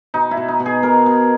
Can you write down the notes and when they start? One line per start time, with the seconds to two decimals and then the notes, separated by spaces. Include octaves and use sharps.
0.14 B2 D#4
0.31 E4
0.37 B2
0.48 D#4
0.60 B2
0.66 G#4
0.83 B2 A#4
1.06 B2